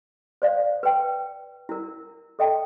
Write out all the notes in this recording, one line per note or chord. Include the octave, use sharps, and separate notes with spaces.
C5 D5 F5
B4 G5
E4 A#4
A4 D#5 G5 A5